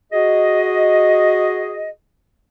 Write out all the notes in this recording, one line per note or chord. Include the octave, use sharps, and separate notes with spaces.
F#4 G#4 D#5